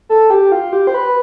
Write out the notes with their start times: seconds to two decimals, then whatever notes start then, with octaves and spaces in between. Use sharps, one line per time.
0.09 A4
0.30 G4
0.52 F4
0.73 G4
0.87 C5
0.94 B4